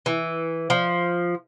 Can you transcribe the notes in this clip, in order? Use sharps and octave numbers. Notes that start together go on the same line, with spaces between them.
E3
F3